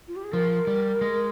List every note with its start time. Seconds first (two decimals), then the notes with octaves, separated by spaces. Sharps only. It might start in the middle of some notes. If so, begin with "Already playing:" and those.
0.08 F4
0.16 G4
0.24 G#4
0.33 F3 A#4
0.67 G3
1.01 G#3